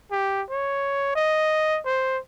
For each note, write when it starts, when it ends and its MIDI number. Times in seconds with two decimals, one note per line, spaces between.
0.11 0.42 67
0.50 1.14 73
1.15 1.79 75
1.85 2.19 72